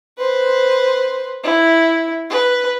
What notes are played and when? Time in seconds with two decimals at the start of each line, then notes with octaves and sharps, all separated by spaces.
0.18 B4 C5
1.44 E4
2.29 B4